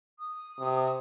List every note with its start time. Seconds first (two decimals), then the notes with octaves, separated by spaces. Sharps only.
0.19 D#6
0.59 C3